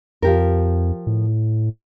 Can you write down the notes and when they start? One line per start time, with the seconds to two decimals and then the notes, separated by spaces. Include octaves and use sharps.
0.22 F2 F3 G4 A#4
1.07 A2